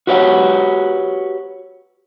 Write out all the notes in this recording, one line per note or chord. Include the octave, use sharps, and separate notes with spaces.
F#4 G4 B4 C#5 D#5 F#5